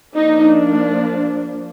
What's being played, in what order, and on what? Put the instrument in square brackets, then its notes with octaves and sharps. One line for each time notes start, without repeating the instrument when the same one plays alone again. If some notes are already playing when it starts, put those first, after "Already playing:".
[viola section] F3 A#3 D4 D#4